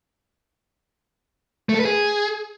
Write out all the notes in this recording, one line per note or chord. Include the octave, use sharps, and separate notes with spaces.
A3
A4
B4
G#4